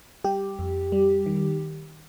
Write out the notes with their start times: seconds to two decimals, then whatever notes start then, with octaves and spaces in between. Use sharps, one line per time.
0.24 G3 G4
0.59 F2
0.92 G3
1.26 D#3